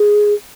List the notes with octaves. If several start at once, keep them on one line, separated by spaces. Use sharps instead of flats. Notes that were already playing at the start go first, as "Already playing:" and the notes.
Already playing: G#4